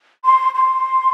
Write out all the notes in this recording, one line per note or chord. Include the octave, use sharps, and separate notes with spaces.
C6
C6